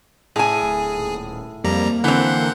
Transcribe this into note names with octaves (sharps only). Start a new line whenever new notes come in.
A2 G#4 G#5
D1
D#1
F2 G3 A#3 A#5
D3 E3 C4 F#5 G6